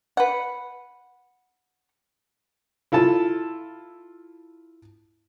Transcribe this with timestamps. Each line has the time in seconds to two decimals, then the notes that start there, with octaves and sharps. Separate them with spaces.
0.17 B4 F#5
2.92 E4 F4 A4 A5